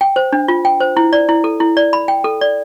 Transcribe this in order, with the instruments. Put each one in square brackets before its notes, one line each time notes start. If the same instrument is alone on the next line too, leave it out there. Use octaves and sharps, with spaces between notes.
[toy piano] G5
C5
D4
F4
G5
C5
E4
D5
E4
A4
E4
D5
B5
G5
A4
D5